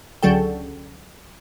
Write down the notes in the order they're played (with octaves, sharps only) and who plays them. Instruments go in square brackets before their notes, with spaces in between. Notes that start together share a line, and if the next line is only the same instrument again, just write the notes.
[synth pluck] C#2 D3 F#3 A4 G5